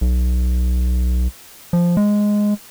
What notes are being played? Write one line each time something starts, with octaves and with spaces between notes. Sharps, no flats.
B1
F3
G#3